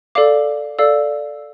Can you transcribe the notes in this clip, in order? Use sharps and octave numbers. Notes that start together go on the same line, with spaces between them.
A4 D5 F5 D6
A4 D5 F5 E6